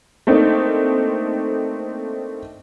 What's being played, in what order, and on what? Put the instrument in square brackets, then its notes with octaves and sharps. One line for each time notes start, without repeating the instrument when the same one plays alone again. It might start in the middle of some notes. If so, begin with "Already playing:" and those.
[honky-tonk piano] A3 A#3 C4 D4 D#4